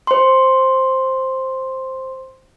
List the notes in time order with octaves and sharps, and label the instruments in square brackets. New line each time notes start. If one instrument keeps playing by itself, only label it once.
[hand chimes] C5 C6